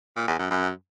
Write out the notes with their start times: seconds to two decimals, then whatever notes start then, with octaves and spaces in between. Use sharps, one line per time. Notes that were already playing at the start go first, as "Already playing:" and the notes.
0.16 A#2
0.28 E2
0.39 F#2
0.50 F#2